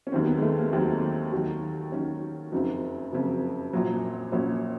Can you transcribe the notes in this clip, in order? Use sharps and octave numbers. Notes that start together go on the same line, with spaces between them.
C#4
D#2 D#3 F#3 C4
B3
G#3
A3
A#3
D#2 D#3 F#3 C4
D#2 D#3 F#3
D#2 D#3 F#3 C#4
F#1 F2 C#3 F#3 D#4
F#1 F2 C#3 F#3
A#1 A#2 F#3
A#1 A#2 F#3 C#4